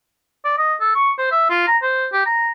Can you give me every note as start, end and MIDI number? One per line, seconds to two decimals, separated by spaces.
0.45 0.54 74
0.58 0.74 75
0.80 0.93 69
0.95 1.10 85
1.18 1.30 72
1.32 1.45 76
1.50 1.67 65
1.68 1.77 82
1.82 2.07 72
2.13 2.21 67
2.26 2.51 82